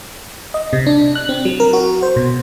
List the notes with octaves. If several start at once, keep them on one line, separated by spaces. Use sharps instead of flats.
D#5
C3
D4
F#6
C4
F#3
A#4
F#4
C5
B2